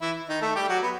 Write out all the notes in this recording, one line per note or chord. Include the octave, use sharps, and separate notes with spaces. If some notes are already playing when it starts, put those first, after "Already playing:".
E3 E4
D#3 D#4
A3 A4
G3 G4
F#3 F#4
B3